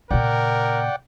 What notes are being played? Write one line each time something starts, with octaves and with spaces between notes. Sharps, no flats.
A#2 C#3 A#4 D5 F#5 G5